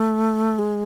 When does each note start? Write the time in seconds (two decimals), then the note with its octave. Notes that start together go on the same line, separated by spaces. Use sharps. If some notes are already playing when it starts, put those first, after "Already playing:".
Already playing: A3
0.59 G#3